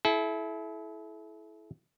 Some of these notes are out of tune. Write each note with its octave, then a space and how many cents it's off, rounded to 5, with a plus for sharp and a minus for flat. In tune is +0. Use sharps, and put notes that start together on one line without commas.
E4 +0 A4 -40